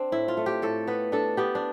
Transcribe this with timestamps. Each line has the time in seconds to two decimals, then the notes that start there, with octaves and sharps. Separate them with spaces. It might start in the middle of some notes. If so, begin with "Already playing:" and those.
Already playing: C4 D4
0.12 A2 E4
0.28 F4
0.37 A3
0.46 G4
0.62 A2 A4
0.87 B3 B4
1.12 D4 A4
1.37 B3 G4
1.55 D4